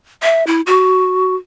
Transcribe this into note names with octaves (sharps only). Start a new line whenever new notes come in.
E5
E4
F#4